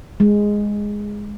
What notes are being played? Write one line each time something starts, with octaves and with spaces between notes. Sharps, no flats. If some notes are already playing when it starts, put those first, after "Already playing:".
G#3